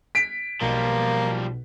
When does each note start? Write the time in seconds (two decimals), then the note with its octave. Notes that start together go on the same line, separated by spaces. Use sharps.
0.15 B6 D7
0.61 B1 B2 F3 G3 A#3